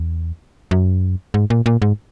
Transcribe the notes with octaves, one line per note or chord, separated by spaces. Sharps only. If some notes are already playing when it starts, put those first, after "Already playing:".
Already playing: E2
F#2
G#2
A#2
A#2
G#2